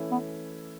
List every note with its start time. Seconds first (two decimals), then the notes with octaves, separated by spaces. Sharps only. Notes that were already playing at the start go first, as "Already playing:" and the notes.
Already playing: E3 A3 C#4 E4
0.11 B3